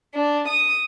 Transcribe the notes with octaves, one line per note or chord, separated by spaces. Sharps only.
D4
D#6